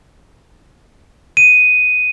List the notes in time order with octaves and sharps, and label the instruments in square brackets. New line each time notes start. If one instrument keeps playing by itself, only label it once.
[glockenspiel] D#7